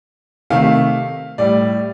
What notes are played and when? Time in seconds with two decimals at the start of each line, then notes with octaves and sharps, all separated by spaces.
0.50 C3 D#3 A3 F5
1.38 A2 G3 D5